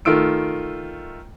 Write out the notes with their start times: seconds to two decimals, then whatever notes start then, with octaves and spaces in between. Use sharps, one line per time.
0.05 D#3 A3 F4 E6 D7